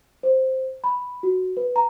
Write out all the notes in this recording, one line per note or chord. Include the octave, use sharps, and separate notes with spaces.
C5
B5
F#4
B4
A#5